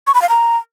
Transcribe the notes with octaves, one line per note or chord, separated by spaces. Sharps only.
C#6
B5
F5
A#5